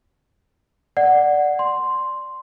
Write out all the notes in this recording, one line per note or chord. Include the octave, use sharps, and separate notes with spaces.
D5 F#5
C6